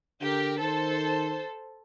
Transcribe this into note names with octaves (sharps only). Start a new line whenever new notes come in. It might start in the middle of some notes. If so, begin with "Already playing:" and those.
D3 G4 A#4
D#3 A4 C5